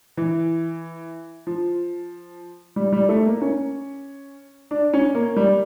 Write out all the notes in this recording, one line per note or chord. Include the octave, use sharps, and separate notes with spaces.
E3
F3
G3
G3
A3
A#3
C#4
D4
C#4
A#3
G3